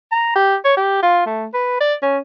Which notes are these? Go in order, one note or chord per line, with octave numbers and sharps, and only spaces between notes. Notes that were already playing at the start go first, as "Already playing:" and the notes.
A#5
G4
C#5
G4
F4
A3
B4
D5
C#4